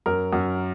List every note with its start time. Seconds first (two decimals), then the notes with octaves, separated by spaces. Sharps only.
0.06 F#2 A#4
0.33 F#2